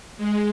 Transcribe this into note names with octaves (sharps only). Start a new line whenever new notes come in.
G#3